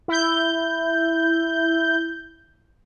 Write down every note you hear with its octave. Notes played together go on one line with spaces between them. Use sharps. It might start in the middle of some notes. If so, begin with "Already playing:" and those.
E4 G6